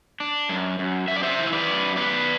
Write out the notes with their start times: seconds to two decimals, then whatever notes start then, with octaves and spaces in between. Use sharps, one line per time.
0.20 D4
0.49 F#2
0.79 F#2
1.08 F#2 E5
1.17 D5
1.23 C5 E5
1.39 E3
1.47 E5
1.53 B4 D5
1.67 F#2
1.96 B3 B4 D5